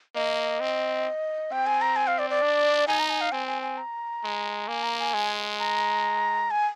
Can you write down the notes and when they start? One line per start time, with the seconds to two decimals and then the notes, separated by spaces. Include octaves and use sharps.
0.15 A#3 D#5
0.60 C4
1.52 C4 G5
1.67 G#5
1.81 A#5
1.96 G#5
2.07 F5
2.19 D5
2.30 D5
2.42 D4
2.88 D#4 G#5
2.99 A#5
3.10 G#5
3.21 F5
3.32 C4 G#5
3.47 G#5
3.62 G#5
3.78 A#5
4.24 G#3
4.68 A#3 G#5
4.83 A#5
4.99 G#5
5.14 G#3
5.60 A#5
6.51 G#5